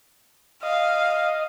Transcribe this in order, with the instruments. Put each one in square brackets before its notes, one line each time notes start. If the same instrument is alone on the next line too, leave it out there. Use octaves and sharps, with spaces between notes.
[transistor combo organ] D#5 [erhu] F5